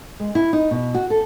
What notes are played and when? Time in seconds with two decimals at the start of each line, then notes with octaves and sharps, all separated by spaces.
0.20 G#3
0.35 E4
0.53 D#4
0.71 B2
0.94 F#4
1.10 A4